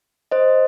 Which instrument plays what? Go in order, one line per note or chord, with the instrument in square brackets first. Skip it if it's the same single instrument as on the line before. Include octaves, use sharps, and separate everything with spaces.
[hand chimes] C5 D#5